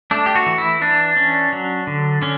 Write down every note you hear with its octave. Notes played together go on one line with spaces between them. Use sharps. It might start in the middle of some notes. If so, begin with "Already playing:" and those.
A3 D4
G4
F#4
E3
E4
E3 D4
C#4
F#3
D3
D3 C#4